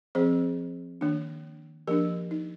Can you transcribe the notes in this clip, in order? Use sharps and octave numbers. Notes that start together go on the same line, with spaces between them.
F3 C4 G#4 C5
D#3 A#3 D4
F3 A#3 D4 G4 A#4
D#4